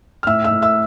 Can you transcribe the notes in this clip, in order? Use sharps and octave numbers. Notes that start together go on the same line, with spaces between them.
F6
A2 E5 E6
E5 E6
A2
E5 E6